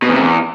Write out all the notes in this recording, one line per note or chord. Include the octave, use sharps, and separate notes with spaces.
B2
E2
C3
E2